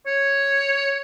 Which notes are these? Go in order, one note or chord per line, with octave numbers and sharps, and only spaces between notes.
C#5